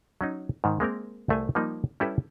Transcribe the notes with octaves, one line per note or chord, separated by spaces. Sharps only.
F#3 C#4 D#4
G#2 D#3
G#3 A#3 C4 A#4
C2 A3 C5 G#5
F3 G3 A#3 D#4
G3 C#4 E4 G4 A4 B4